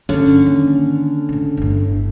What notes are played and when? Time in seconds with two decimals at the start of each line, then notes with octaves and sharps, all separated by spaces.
0.09 G2 D3 C#4 E4
0.46 D#3 A#3
1.29 A2 C#3
1.57 G1 A2